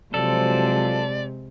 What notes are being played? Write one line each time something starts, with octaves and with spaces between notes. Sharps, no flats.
C3 F3 F#3 G#3 A4 D5